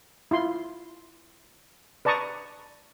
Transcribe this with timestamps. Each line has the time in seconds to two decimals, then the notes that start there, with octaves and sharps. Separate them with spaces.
0.31 E4 F4 C6
2.05 B4 D5 A5 A#5 C#6 D#6